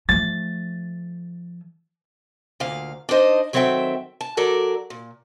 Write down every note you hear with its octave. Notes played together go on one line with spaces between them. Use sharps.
F3 A3 A6
D2 A#2 F5
D4 D#4 C5 D#5
D#3 F#3 C4 A4 E5 G5
A5
F#3 A4 A#4 D5
A#2